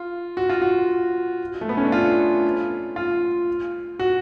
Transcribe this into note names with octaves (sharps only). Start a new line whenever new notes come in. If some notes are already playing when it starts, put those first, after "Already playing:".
Already playing: F4
F#4
F4
F#4
A3
B3
C#4
D4
F4
F4
F#4